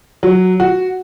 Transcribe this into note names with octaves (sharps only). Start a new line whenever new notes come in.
F#3
F#4